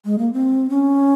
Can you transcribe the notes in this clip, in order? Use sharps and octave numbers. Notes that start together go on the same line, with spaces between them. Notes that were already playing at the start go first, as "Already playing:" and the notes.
G#3
A#3
C4
C#4